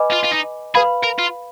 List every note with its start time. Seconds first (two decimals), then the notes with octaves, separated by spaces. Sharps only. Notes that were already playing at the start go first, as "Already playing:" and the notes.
Already playing: B4 D#5 G#5 B5 D6
0.11 F4
0.24 F4
0.32 D#4
0.75 G#4 B4 F5 B5
1.04 A#4
1.19 F4